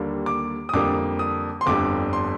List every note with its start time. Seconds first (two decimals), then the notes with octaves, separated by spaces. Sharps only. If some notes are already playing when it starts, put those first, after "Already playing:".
Already playing: D#2 D3 G3 A#3
0.26 D6
0.69 D#6
0.73 F2 D3 G3 A#3 D6
1.19 D#6
1.61 C6
1.66 G1 F2 D3 G3 D6
2.13 C6